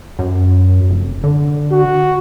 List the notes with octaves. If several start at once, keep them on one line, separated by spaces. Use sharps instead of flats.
F#2
F1
D3
F#4